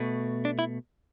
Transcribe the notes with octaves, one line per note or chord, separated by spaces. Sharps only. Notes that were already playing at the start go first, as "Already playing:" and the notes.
Already playing: B2 A3
D4
E4